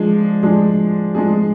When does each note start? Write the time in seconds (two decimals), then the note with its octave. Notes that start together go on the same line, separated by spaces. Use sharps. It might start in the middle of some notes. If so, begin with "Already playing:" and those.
Already playing: F3 G#3 D4 G#4
0.43 F3 G#3 D4 G#4
1.15 F3 G#3 D4 G#4